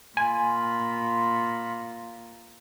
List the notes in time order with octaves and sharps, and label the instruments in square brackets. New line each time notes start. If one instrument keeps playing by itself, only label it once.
[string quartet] A#2 [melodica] F4 B5 [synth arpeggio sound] G#5